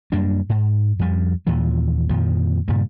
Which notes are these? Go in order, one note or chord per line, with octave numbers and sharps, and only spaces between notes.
F#2 G3 A#3 D4
G#2
F2 F3 G3
D#2 A#2 E3 F3
F2 A#2 D#3 F3
G2 A#2 C#3 G3